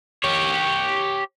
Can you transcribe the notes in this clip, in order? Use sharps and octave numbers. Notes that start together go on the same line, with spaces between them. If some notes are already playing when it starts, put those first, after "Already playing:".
G4 C#5